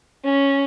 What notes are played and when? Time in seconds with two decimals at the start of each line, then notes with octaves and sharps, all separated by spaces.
0.25 C#4